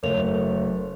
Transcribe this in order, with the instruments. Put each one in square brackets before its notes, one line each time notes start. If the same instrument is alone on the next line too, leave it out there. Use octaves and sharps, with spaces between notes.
[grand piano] F#1 A3 [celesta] A#4 C#5 F7